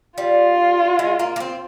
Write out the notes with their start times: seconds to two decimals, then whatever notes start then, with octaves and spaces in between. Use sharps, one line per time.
0.18 G3 F4
0.99 G#3
1.19 A#3
1.36 A#3
1.40 C4